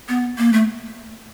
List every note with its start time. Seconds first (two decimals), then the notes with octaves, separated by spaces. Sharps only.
0.09 B3
0.38 A#3
0.53 A3